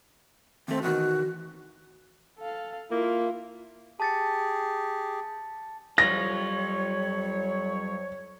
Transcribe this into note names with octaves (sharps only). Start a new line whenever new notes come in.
D#2 A3 C4
E2 B2 D#3 F#4
A4 F5
A#3 E4 F4
G4 G#4 A5 A6 C#7
F2 F#3 G3 F4 C#5 A#6